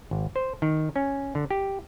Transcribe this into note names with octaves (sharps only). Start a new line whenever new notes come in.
G#1
C5
D#3
C#4
D3
G4